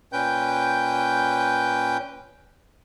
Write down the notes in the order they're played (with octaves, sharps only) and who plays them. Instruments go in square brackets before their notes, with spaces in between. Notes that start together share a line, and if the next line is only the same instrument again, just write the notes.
[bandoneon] A#2 C#4 B4 G5 G6